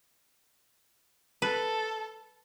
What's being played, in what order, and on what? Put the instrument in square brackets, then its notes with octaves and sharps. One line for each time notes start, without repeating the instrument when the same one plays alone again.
[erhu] A4 [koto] B4